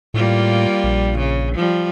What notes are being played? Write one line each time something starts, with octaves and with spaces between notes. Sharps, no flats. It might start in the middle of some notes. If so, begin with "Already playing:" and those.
A2 G3 A#3 F4
A#1
C#3
F3 G3